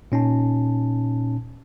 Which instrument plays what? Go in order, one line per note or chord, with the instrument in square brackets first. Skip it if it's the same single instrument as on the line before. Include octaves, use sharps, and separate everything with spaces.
[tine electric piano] A#2 C#4 D#4 A5